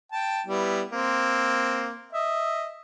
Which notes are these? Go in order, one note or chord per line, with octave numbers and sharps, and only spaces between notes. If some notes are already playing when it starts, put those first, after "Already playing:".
G5 A5
G3 B3 E4
A#3 C4
D#5 E5